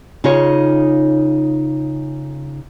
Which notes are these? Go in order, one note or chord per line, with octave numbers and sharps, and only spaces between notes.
C#3 D#4 F4 G#4 C#5